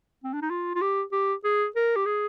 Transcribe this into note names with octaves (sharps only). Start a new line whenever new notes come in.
C4
D4
D#4
F4
F4
G4
G4
G#4
A#4
G4
G#4